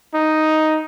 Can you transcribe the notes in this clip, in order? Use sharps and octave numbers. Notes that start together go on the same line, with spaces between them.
D#4